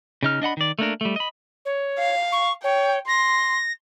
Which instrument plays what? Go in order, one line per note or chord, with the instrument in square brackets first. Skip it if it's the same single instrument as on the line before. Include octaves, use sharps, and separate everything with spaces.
[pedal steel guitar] C#3 D#4 F6
D4 D#5 F#5 B5
D#3 D5
A3 A#3 D4 A#4
G3 A3
D#5 B5
[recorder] C#5
[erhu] F5
[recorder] C#6
[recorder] C#5 [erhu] G5
[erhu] C6 [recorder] A#6